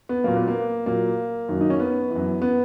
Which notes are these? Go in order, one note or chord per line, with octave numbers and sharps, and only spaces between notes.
B3
A#2 F#3 A#3
B3
A#3
A#2 F#3 A#3
F#2 D#3 F#3
D#4
C#4
B3
F#2 E3
B3